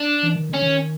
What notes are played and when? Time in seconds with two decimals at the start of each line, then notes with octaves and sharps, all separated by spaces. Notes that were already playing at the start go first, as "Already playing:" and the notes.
Already playing: D4
0.23 E3
0.36 D#3
0.50 D3 C#4
0.62 D#3